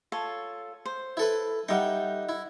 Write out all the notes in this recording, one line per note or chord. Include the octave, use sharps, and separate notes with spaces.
F4 A4 C#5
C5
E4 A4 B4
G3 D#4 E5 F#5 G5
E4